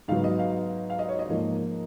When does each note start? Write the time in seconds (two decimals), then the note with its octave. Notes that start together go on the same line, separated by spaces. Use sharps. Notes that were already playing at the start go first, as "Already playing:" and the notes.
0.08 G#2 F#3 B3 F5
0.24 D#5
0.39 F5
0.90 F5
0.99 D#5
1.09 C#5
1.19 D#5
1.29 G#2 F3 A#3